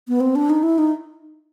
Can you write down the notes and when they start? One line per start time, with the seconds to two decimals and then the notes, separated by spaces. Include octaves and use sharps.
0.08 B3
0.21 C4
0.35 D4
0.50 D#4
0.63 E4
0.78 D#4